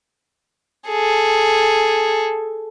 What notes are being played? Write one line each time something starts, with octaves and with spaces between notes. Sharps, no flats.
G#4 A4